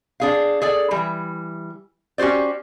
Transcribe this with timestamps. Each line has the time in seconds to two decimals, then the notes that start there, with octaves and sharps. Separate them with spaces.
0.20 D4 G#4 F5
0.62 G#4 A4 D5
0.91 E3 G3
2.18 C#4 F#4 G4 C5 D5